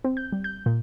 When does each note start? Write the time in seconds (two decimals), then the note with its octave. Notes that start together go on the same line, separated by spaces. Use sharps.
0.04 C4
0.17 G6
0.32 G3
0.44 G6
0.66 A#2